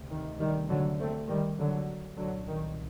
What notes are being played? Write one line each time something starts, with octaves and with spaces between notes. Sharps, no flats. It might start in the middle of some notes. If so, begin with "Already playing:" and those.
Already playing: D2 C3
D#3
D#3 G3
D3 F#3
A3 C4
D#3 G3
D3 F#3
C2 A#2 D3 F#3
D#3